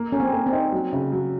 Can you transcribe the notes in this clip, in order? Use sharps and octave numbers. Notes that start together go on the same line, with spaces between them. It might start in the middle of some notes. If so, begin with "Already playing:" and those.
Already playing: A#3
A#3 C#4
C4
A#3
C4
D#4
F#3
C#3
F#3